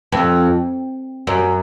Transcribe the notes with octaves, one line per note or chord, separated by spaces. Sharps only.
F2
F#2